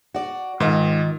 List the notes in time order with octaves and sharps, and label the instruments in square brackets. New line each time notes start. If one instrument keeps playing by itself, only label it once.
[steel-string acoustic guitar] F#4 D5
[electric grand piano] G#2 [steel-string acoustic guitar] D#3 F4 D#5